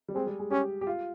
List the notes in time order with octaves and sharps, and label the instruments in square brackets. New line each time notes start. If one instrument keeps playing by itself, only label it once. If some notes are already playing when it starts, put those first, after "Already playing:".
[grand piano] G3
[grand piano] G#3 [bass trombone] C4
[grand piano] G3
G#3
[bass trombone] C#4 [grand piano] G4
[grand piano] G4
F4